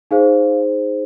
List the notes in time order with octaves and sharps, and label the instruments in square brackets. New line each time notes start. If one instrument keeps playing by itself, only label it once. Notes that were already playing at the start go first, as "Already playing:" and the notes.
[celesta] D#4 G#4 C5 F5